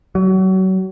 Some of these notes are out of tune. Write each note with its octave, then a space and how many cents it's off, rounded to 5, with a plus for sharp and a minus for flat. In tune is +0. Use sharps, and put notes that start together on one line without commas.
F#3 +30